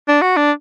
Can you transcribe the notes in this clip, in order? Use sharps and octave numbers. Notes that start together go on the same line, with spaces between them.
D4
F#4
D4